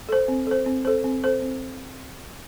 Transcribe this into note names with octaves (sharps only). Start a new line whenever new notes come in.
A4 C5
C4
A4 C5
C4
A4 C5
C4
A4 C5
C4